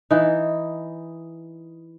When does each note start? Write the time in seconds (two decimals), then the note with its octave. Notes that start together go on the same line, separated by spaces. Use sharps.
0.11 E3 D#4